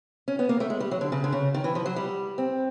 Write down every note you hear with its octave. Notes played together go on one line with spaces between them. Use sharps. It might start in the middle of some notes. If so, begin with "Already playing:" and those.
C#4
B3
A#3
A3
G#3
G3
F#3
D3
C#3
D3
C#3
D#3
E3
F3
F#3
G3
C4